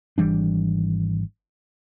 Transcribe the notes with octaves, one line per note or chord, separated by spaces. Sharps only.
G#1 E3 G3 D4